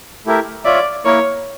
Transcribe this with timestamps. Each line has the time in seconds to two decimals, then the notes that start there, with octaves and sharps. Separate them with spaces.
0.26 A3 E4 G4 A#4 E5
0.64 F4 C#5 D5 E5
1.05 A#3 E4 A#4 C#5